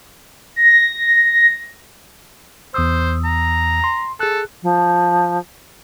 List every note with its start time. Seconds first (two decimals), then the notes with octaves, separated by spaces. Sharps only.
0.56 A#6
2.74 E2 C5 D#6 E6
3.25 A#5
3.84 C6
4.20 G#4 A4 F#6
4.62 F3